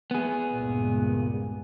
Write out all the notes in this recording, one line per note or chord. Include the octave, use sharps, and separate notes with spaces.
B3 G#4
C#2 G2 A#2